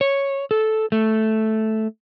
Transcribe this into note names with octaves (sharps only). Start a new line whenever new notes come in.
C#5
A4
A3